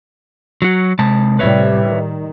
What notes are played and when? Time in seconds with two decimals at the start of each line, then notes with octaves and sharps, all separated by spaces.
0.62 F#3 F#4
0.99 C3 G#3 A5
1.39 A2 C3 G3 B4 C#5 E5
1.87 D#3